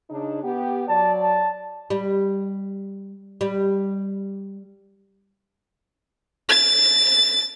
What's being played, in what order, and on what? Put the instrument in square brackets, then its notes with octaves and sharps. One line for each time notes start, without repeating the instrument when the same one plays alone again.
[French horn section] C#3 D4 D#4
B3 G4
[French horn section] F#3 D5 [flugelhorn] A5
[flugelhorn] A5
[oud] G3
G3
[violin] A6